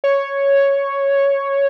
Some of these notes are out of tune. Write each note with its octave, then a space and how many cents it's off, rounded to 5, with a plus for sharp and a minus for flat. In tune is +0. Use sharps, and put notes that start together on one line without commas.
C#5 +0